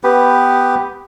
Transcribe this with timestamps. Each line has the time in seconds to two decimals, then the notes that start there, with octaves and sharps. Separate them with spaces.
0.04 B3 G4 B4